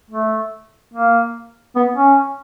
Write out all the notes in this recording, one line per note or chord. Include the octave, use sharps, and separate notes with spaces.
A3
A#3
B3
C#4